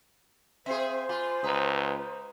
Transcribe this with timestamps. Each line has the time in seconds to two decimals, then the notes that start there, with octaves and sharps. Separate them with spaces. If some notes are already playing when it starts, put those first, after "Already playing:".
0.66 C4 G#4 C5 E5 F5
1.09 F4 G#5 B5 D6
1.44 C#2 B4 A#5 D#6